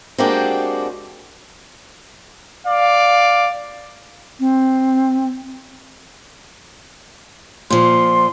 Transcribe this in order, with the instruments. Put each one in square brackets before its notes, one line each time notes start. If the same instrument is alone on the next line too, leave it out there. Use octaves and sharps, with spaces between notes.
[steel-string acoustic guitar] G#3 A#3 C4 D4 F#4 G4
[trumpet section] D5 F5
[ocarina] C4
[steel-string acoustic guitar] A#2 F3 [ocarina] C6